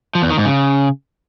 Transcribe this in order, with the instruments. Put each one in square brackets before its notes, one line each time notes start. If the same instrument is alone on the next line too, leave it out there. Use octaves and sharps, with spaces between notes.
[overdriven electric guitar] F3
E2
D#3
G#2
C#3